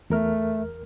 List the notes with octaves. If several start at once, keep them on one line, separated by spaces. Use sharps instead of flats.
E2 A3 A#4 F6